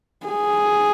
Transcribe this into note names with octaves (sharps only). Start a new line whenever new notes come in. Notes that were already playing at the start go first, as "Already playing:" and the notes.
G#4